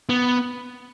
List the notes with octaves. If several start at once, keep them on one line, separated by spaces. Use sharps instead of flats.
B3